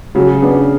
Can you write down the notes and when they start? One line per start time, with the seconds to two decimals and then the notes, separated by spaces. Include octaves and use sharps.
0.15 C#3 F#3
0.42 B3 D4